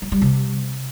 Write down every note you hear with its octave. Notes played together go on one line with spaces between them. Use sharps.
F#3
G3
C3